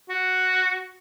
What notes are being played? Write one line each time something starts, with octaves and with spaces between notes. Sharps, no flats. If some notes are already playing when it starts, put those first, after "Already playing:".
F#4